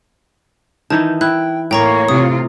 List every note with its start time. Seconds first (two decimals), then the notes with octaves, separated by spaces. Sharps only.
0.90 D#3 E3 D#4 A5
1.21 E4 G5 F#6
1.71 A2 A#3 C#5 G5 A#5 C#6
2.09 C3 F4 D#6